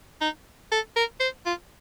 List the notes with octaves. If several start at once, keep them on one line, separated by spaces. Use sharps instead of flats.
D#4
A4
A#4
C5
F4